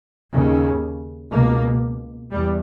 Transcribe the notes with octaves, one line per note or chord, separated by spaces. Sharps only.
D#2 C#3
C#2 B2 A#3
E2 G3